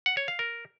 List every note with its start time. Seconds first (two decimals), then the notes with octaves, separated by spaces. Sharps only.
0.06 F#5
0.17 C#5
0.28 F5
0.39 A#4